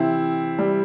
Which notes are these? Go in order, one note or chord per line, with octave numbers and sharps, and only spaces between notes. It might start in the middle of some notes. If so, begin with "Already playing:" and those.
Already playing: C3 E3 C4 E4
G3